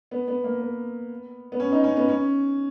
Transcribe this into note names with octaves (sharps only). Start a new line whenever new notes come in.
B3
B3
A#3
B3
B3
C#4
D#4
C#4
B3
C#4